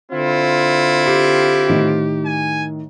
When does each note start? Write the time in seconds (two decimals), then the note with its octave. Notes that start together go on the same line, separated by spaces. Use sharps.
0.12 D3 C4 E4 F4
1.07 G4 C7
1.68 A2 D#3
2.25 G#5